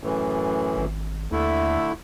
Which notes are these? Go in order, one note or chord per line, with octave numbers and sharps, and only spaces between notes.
F#2 A2 E3
G#1
D#2 D3 A3 E4